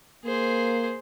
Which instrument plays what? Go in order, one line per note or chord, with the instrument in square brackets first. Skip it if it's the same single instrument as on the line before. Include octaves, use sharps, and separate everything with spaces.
[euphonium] A#3 [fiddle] G#4 C5